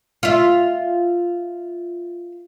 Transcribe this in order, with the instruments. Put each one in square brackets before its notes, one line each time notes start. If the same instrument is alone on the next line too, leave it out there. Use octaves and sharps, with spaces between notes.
[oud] F4 E5